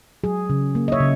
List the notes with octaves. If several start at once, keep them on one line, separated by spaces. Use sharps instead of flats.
F#3 G#4
C#3
A#3
D#5
C#5 E5
C#3